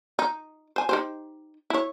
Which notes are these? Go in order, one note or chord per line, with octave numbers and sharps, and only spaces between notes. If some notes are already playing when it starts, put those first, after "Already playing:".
D#4
C5 G#5
D#4 G4 C5
E4 C#5